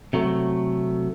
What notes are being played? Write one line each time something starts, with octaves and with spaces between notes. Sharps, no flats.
C3 F#3 A3